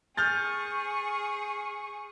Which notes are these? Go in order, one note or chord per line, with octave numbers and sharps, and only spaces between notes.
G#4 C#6 F6 G6 A6